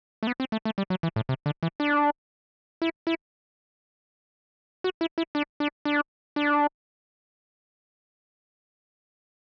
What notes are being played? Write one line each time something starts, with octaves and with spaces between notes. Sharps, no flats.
A3
B3
C4
A3
A3
G3
F#3
E3
A2
C3
D3
E3
D4
E4
E4
F#4
E4
E4
D4
D4
D4
D4